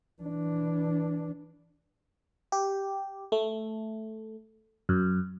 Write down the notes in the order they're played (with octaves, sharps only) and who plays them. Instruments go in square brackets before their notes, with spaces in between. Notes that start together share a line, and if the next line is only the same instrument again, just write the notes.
[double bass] E3 D4
[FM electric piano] G4
A3
F#2